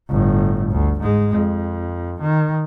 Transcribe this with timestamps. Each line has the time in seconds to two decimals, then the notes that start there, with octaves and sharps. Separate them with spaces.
0.10 G1 A2
0.70 D2
1.01 G#2 G#3
1.35 F2
2.21 D#3